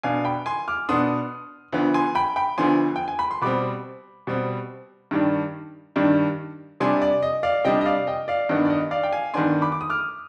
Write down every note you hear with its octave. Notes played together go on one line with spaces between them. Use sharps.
B2 B3 D4 F5 G#5
G5 B5
G#5 C6
D6 F6
B2 B3 D4 C6 D#6
D2 D3 F3 B3
G#5 C6
G5 B5
G5 B5
D2 D3 F3 B3 G#5 C6
G5
G#5
B5
C6
B2 G3 C4 B5 D6
B2 G3 C4
G2 D#3 G3 D4
G2 D#3 G3 D4
C3 G3 D4 G#5 C6
D5
D#5
D5 F5
C3 G3 D4 D#5 G5
D#5
D5 F5
D#5 G5
D5 F5
G2 D#3 B3 D4 D#5
D5
D#5
D5 F5
G5
F5 G#5
G2 D#3 B3 D4 G#5 C6
B5 D6
D6
D#6
D6 F6